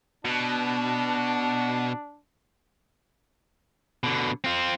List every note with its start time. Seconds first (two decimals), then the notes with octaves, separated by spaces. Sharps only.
0.25 B2 D4
4.04 B2 D3
4.44 C4 F4